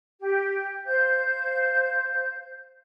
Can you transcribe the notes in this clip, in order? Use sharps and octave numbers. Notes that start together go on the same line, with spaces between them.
G4
C5 F5 G6